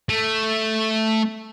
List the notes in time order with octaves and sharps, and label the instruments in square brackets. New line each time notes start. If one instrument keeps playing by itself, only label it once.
[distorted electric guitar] A3